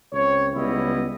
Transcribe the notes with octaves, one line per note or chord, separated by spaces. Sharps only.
C#2 C4 C#5
C#2 G3 B3 E4 D#5